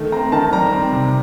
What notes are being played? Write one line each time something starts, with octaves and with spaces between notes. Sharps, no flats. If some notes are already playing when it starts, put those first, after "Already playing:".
Already playing: D#3 A3
C4 A#5
D#3 A5
G3 A#5
C4
C3